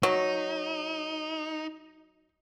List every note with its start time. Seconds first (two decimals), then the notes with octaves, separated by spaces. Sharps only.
0.03 F#3 D#4